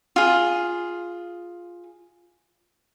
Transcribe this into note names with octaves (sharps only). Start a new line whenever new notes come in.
F4 G#4